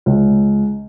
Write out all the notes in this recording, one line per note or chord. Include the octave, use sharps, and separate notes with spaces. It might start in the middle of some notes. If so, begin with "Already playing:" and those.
C#2